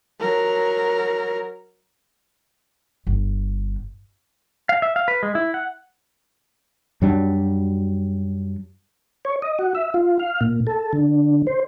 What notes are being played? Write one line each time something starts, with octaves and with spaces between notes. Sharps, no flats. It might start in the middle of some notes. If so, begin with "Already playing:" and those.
F#3 A#4
G1
F5
E5
F5
B4
G#3
E4
F#5
F#2 F#3 G3 D4
C#5
D#5
F#4
E5
F4
F5
A#2
A4
D3
C5